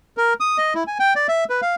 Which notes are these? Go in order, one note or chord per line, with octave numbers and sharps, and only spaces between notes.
A#4
D#6
D#5
E4
G#5
G5
D5
E5
B4
F5